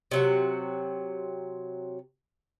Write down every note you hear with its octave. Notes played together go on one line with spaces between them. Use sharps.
C3 F#3 F#5